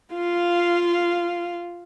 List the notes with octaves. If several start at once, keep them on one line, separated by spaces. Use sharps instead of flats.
F4 F5